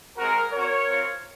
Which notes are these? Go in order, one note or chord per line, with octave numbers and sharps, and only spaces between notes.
G#3 C4 F#4 A#4
C4 F#4 A#4 C#5
C4 F4